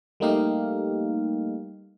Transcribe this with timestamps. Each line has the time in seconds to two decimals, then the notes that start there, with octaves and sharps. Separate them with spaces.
0.20 G3 A3 A#3 D#4 G4 F5